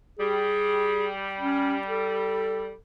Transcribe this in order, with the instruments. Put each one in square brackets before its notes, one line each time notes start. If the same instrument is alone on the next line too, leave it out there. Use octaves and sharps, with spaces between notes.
[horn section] G3 [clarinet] G#4
[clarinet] C#4
A4